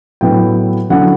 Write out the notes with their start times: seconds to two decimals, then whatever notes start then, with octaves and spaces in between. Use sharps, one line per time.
0.21 A2 F#3 B3 E4 G5
0.90 D3 F#3 C#4 E4 F#5